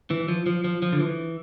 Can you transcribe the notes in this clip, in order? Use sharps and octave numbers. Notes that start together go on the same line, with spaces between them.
E3
F3
F3
F3
F3
D3
E3